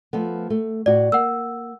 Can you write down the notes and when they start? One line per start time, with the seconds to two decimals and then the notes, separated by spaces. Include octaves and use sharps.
0.13 F3 A3 B3
0.50 A3
0.86 A2 F#4 D5
1.12 A#3 F#5 E6